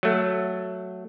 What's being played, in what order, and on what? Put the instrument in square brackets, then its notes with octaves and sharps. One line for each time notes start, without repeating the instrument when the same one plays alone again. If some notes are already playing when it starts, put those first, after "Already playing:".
[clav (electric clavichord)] F#3 A3